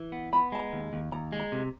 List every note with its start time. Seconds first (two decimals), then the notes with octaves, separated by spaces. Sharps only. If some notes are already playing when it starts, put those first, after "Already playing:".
Already playing: E3
0.12 B3
0.33 B3 B5
0.52 G#3 A5
0.59 A#5
0.73 D#2
0.93 D#2
1.12 D#2 A#5
1.32 G#3
1.40 A#5
1.52 C3